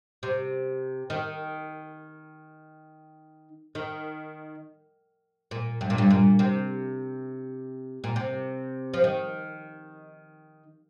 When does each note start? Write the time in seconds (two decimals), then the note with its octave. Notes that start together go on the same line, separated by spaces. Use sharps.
0.23 C3
1.10 D#3
3.75 D#3
5.51 A#2
5.81 G2
5.90 A#2
5.98 G2
6.10 A#2
6.39 C3
8.04 A#2
8.16 C3
8.94 F3
9.04 D#3